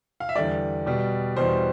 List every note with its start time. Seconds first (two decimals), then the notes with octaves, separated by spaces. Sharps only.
0.20 F5
0.29 E5
0.36 E2 D3 G3 D5
0.86 B2 G3
1.37 E2 B2 G3 C5